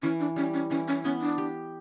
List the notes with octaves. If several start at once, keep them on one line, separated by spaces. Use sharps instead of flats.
E3 C#4
D4
G3 C#4
C#4
E3 C#4
C#4
B3 C#4
D4
G4